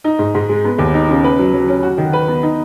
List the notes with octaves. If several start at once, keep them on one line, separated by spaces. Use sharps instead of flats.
D#4
G#2
G#2
G#3
B3
D#2
D#4
C#3
B4
F#3
F#3
C#4
F#4
D#3
B4
B3
D#4